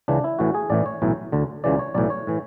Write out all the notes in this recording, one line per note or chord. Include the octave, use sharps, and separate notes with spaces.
C#2 C#3 E3 D4
E4
A1 A2 E3 F#4
G#4
A1 A2 E3 D5
C#5
B1 A2 E3
D2 D3
C#2 C#3 E3 D5
C#5
B1 A2 E3 D5
C#5
A2 E3